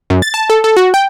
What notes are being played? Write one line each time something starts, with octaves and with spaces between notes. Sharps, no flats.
F#2
A6
A5
A4
A4
F#4
G5